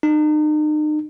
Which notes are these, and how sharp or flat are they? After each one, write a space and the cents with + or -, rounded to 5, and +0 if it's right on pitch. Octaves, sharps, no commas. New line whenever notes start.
D#4 -40